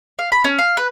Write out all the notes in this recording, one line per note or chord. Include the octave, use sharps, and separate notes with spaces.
F5
B5
C#4
F5
B4